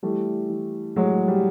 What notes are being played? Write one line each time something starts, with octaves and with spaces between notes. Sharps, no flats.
E3 G3 A3
E3
A2 F#3 G#3
G3